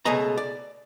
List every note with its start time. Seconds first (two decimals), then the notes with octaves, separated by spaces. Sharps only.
0.05 C#2 B2 A3 G#4 D#5 A#5
0.38 D5